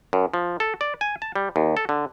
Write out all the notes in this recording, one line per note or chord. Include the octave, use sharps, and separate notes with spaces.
F#2
F3
A4
D5
G#5
A5
G3
D#2
A4
D3